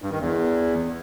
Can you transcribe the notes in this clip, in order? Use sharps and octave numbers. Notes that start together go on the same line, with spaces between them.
G2
D#3
E2